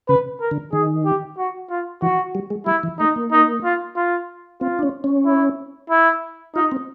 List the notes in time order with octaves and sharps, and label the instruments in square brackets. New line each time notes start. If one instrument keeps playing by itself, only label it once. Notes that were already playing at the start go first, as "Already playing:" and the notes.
[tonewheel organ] C#3 [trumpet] B4
[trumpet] A#4
[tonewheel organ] D3
[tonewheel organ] D#3 [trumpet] G#4
[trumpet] G4
F#4
F4
[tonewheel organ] E3 [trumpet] F#4
[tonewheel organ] G3
G#3
[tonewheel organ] G3 [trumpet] E4
[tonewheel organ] E3
[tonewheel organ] A3 [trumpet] D#4
[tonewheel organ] A#3
[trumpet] D#4
F4
F4
[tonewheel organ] C4 [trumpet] F4
[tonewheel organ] D4
C#4
C#4
[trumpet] E4
E4
[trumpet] D#4 [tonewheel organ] F4
[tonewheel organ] C4